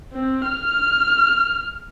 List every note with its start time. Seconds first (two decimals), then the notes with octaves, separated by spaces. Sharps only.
0.13 C4
0.47 F6